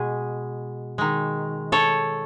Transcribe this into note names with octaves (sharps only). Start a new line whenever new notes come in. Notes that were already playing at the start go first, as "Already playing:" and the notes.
Already playing: B2 G#3 G#4
D#3 G#3
A4 C#5